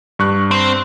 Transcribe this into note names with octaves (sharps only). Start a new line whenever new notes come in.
G2 C#6 F#6
C4